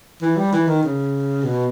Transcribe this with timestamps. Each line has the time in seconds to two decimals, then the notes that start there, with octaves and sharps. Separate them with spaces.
0.22 E3
0.37 G3
0.53 E3
0.67 D#3
0.83 C#3
1.44 B2